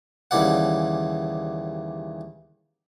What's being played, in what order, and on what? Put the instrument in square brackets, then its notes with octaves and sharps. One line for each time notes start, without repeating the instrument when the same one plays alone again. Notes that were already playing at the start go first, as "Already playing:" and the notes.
[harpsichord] D#2 C#3 E3 G3 D5 F#5